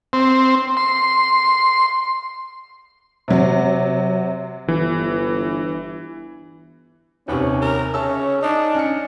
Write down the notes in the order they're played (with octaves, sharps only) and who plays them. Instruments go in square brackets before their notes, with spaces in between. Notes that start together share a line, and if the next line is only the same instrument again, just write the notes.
[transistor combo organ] C4
C6
[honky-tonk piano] C3 F#3
[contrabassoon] G1 [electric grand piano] E3
[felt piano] D#2 C3 [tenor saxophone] B3 [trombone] C#4
[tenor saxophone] A#4
[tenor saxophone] C#3 [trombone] C#4 [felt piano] E5 A5 E6
[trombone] D4 [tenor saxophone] D#4
[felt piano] C#4 F6 C#7